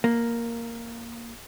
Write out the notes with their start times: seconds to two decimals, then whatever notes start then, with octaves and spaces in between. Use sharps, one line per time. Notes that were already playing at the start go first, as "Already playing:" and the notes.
0.04 A#3